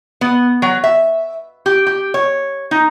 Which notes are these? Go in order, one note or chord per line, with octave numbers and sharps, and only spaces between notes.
B3
F#3
E5
G4
G4
C#5
D#4